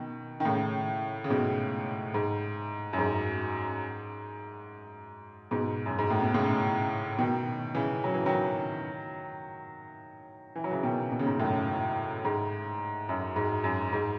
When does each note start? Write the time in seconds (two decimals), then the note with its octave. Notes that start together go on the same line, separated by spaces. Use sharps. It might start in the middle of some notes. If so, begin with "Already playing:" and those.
Already playing: B2 D#3
0.40 D#3
0.45 A2 C#3
1.24 C#3
1.30 G#2 B2
2.14 G#2
2.93 F#2
2.99 G#2
5.51 G#2 B2
5.86 F#2
5.99 G#2
6.10 A2
6.22 B2
6.34 A2 C#3
7.19 B2 D#3
7.75 C#3 E3
8.04 F#3
8.14 E3
8.26 D#3 F#3
10.56 E3
10.64 F#3
10.71 C#3 E3
10.83 B2 D#3
11.12 B2
11.20 C#3
11.26 G#2 B2
11.40 F#2 A2
12.25 G#2
13.09 F#2
13.36 G#2
13.64 F#2
13.93 G#2